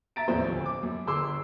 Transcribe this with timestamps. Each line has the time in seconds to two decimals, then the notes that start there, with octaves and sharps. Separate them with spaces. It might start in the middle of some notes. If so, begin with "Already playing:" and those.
0.16 E5 A#5 A6 D7
0.28 D#1 A#1 F2 A2 F#3 C5
0.52 D2
0.66 D6
0.83 F#2
1.07 G1 G#4 C6 D6 E6